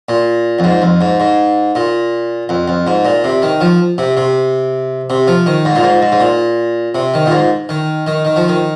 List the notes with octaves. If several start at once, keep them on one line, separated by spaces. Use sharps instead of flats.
A#2
F2
G#2
F2
G#2
G#2
A#2
F2
F2
G#2
A#2
C3
D#3
F3
C3
C3
C3
F3
D#3
G#2
A#2
G#2
G#2
G#2
A#2
C3
D#3
A#2
G#2
D#3
D#3
D#3
F3
D#3